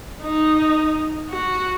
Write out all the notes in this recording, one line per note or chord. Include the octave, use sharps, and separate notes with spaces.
D#4
F#4